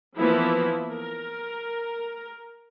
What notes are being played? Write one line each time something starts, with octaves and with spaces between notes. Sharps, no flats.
E3 F3 A#3 B3 E4
A#4